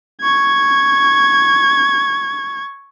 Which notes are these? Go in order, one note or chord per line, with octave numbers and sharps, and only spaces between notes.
C#6 G#6